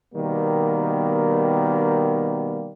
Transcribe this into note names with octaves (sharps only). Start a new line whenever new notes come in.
B2 D#3 G3 A#3 B3